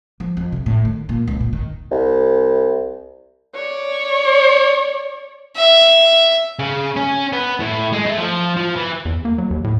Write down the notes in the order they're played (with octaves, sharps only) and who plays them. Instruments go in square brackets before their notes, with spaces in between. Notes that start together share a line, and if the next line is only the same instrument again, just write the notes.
[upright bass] F3
F2
C3
A2
D#3
A#2
C#2
A#2
D#3
[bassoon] C2
[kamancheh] C#5 D5
[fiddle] E5
[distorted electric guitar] C#3
C#4
B3
A2
G#3
A3
F3
F3
E3
[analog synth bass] E2
A#3
F#3
D#2
A2